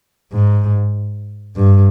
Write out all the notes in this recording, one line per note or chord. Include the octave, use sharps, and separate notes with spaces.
G#2
G2